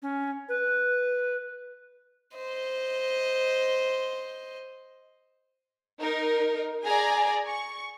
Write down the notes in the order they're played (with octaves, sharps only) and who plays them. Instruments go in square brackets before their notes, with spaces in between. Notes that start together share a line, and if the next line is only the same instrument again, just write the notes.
[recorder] C#4
B4
[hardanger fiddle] C5 D#5
[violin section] D#4 A#4
G#4 D5 G#5 A#5
C#6